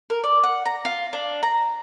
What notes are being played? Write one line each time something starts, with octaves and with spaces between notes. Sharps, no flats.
A#4
D5
F#5
A#5
F4
D4
A#5